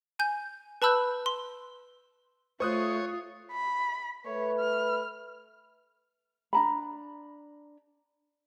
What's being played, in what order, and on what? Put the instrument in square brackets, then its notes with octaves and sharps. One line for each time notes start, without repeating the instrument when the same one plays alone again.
[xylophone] G#5 G6
B4 A5 B5 E6 F#6 G6
C6
[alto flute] A3 [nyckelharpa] F4 [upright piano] C5 D#6 F#6 [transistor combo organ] C#5
[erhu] B5
[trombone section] A3 B4 [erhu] C#5
[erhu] F6
[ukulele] D4 A#5 B5